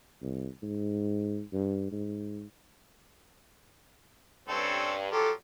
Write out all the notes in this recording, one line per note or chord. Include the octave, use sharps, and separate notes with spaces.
C2
G#2
G2
G#2
G2 C4 C#4 A4
F3 F#3 G4 A4